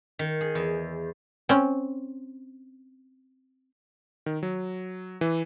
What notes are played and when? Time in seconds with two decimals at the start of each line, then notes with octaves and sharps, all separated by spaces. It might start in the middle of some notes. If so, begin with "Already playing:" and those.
0.19 D#3
0.41 G#4
0.55 E2
1.49 C4 C#4
4.26 D#3
4.43 F#3
5.21 E3